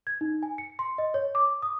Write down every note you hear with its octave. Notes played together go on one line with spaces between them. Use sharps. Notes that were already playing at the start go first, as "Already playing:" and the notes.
G#6
D#4
G#5
C#7
C6
D#5
C#5
D6
D#6